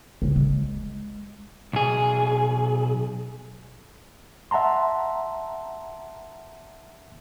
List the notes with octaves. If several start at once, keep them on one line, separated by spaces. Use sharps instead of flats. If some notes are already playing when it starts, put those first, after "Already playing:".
C#2
G#3
B1 G#4
E5 F#5 A5 A#5 C6